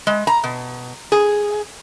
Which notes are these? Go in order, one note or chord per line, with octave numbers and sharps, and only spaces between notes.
G#3
A#5
B2
G#4